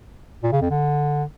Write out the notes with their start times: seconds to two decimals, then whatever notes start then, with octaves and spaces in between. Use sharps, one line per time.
0.43 A#2
0.52 C#3
0.62 F2
0.71 D3